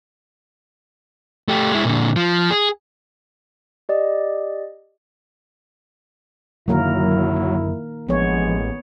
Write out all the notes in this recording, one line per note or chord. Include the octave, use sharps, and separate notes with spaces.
A3 G4
G#3 E4
A#2 D3
F3
G#4
G4 D5 D#5
F#2 D3 D#3 F#3 A#3 E4 A#4
A1 F3 G#3 B3 D4 C#5